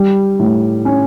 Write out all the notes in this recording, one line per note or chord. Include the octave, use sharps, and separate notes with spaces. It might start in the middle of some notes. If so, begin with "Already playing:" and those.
Already playing: G3
A2
C#4